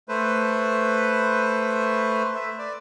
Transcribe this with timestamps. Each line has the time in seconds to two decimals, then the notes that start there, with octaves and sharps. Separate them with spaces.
0.09 A3 B4 C5
2.35 E5
2.59 D5